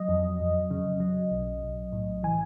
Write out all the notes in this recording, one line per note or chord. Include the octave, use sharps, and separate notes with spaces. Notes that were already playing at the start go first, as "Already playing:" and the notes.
Already playing: F#3 D#5
F2
F2
C#3
F#3
B1
B1
A2
E3 G#5